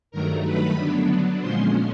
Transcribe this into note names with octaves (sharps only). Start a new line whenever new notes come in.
G2 D#3 F#3 A3 A#4 A#5
B4 B5
D3 F#3 B3 D4
A#2 F3 G#3 C#4 C5 C6